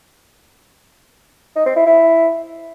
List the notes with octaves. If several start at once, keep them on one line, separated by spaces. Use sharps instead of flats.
D#4
C4
E4
E4